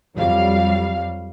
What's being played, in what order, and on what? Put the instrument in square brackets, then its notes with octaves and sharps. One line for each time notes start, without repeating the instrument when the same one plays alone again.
[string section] F2 F#3 G3 F5